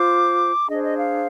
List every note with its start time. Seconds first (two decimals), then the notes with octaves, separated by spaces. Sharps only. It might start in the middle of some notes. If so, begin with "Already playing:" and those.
Already playing: F4 C5 D6
0.68 D4 G#4 C5 D#5
0.83 D#5
0.97 F5